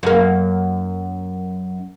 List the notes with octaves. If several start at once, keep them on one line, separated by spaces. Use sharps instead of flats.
F#2 A#3